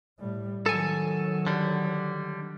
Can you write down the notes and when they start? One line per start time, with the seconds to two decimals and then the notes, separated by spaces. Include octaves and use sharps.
0.19 A2 G3
0.66 D#3 F#3 A4 G#5
1.47 D3 G3